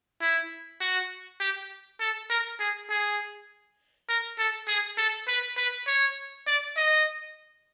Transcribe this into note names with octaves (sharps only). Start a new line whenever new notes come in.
E4
F#4
G4
A4
A#4
G#4
G#4
A#4
A4
G#4
A4
B4
B4
C#5
D5
D#5